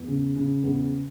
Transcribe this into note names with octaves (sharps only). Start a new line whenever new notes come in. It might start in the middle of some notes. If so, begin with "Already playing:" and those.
Already playing: E2
C#3
C#3
E2